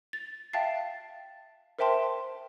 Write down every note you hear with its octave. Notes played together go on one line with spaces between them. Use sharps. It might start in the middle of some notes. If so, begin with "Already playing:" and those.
A6
E5 F5 G5 A5 A6 C7
A#4 C5 E5 G5 A5 C6